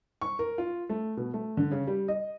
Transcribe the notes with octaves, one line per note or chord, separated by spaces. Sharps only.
C#6
A#4
F4
A3
B2
A3
D3
C#3
G3
D#5